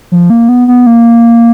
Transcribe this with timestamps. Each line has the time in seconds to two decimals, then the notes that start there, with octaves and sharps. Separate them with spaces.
0.12 F3
0.30 A#3
0.49 B3
0.68 B3
0.86 A#3